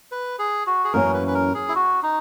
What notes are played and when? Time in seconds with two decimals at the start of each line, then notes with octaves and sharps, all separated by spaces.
0.11 B4
0.39 G#4
0.67 F#4
0.84 G#4
0.93 F#2 E3 A#3 C#4 A#4
1.14 B4
1.28 B4
1.35 A#4
1.55 G#4
1.69 E4
1.76 F#4
2.03 D#4